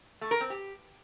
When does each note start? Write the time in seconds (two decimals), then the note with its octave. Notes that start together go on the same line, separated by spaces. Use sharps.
0.21 A3
0.31 A#4
0.41 C4
0.50 G4